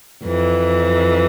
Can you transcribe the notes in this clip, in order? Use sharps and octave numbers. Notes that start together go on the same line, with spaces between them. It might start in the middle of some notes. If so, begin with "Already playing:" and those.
F2 E3